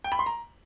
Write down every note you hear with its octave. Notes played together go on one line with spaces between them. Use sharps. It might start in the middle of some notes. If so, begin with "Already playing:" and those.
G5
B5
C6
A#5